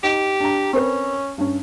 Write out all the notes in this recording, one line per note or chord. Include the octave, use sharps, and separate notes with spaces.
D#4 G4
D4 A#5
C4 C#4 A#4 B4
G2 C#4